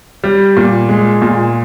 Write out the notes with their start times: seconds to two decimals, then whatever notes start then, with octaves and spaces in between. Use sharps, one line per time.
0.24 G3
0.57 A#2
0.89 G#3
1.22 A#2